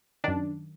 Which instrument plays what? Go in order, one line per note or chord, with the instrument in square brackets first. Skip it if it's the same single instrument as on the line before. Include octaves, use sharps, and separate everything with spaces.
[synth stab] F#2 D#3 D4